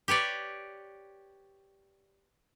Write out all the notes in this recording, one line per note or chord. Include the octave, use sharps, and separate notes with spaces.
G4 B4 C#5 D5